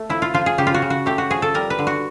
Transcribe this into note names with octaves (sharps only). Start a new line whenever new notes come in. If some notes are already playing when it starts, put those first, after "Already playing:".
Already playing: A3
F3 E4
F4
F3 F4
G#4
C#3 G4
F4
F#4
C#3
F#4
A3 G4
F#4
F3 G#4
A4
G3 A#4
B4
D3
F#4